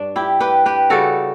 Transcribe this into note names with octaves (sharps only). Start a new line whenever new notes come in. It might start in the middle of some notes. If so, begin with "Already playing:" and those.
Already playing: G2 D4
E4 G4
G4 B4
G4 B4
C#3 G3 F#4 A4